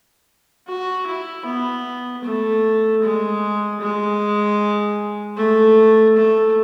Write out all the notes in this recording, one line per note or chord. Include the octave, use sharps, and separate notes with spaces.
F#4
E4
B3
A3
G#3
G#3
A3
A3